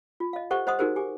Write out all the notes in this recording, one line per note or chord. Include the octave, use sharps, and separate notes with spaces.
F4
D#5 F5
G4 A4 C5 D#5 F#5 C#6
C5 D#5 F#5 C6 D#6
D#4 F#4 G#4 A#4 C5
G4 G#5 D6